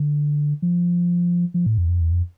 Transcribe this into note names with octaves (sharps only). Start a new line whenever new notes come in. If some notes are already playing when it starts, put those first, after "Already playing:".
Already playing: D3
F3
F3
A2
F2
E2
F2
E2
F2